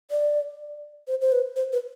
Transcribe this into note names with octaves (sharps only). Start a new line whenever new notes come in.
D5
C5
C5
B4
C5
B4